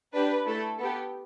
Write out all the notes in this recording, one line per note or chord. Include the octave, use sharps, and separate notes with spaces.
D4 G4 B4
A3 E4 A4
B3 G4 A4